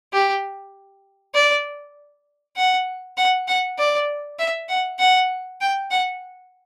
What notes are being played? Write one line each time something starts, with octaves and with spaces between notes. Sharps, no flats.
G4
D5
F#5
F#5
F#5
D5
E5
F#5
F#5
G5
F#5